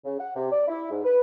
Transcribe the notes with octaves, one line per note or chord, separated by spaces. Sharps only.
C#3
F#5
C3
D5
E4
G#2
B4